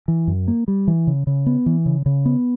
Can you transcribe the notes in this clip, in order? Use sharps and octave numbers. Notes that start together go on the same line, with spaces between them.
E3
F#2
A#3
G3
E3
C#3
C#3
B3
E3
C#3
C#3
B3